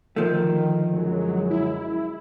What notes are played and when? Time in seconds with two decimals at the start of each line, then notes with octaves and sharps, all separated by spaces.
0.16 D2 D#3 F3 A3
0.93 F#2 F#3 G#3
1.50 E4